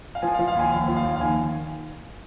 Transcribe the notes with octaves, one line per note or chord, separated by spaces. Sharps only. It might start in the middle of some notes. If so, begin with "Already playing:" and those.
F5
F3 G#5
F5
F3
F5
D#2 G#5
D#2 F5
F3
F5
D#2
F5
D#3 G#5